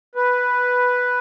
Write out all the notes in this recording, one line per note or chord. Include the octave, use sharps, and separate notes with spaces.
B4